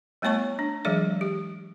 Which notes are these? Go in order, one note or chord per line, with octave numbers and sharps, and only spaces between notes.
G3 A3 B3 C#5 A5 C#6
D4
E3 F#3 G#3 G#4 D5
G4